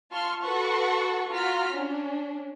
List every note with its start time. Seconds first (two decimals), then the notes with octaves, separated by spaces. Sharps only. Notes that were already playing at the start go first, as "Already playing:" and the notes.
0.12 F4 A5 C6 C#6 F6
0.43 F#4 A4 B4 F#5 A5 C#6
1.30 F4 F#4 A#5 F6 B6
1.74 C#4 D4